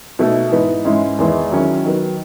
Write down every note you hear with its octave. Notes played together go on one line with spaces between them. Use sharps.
B2 A3 D#4
G#2 E3 B3 D#4
G#2 E3 G#3 C#4 E4
E2 D#3 G#3 B3 E4
D#3 F#3 C#4 E4
D#3 F#3 B3